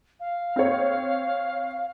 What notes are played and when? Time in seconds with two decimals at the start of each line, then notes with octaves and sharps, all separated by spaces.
0.20 F5
0.56 C4 C#5